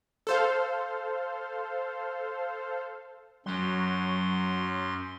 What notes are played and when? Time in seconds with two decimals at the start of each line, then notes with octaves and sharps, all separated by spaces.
0.27 A4 C5 F5
3.46 F#2 F#3 C6